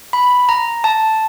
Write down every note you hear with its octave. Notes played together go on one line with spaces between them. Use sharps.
B5
A#5
A5